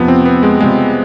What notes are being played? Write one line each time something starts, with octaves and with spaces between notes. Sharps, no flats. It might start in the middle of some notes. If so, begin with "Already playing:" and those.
Already playing: F2 C3 F3 B3
C4
B3
G#3
C3 G3 G#3 B3 F4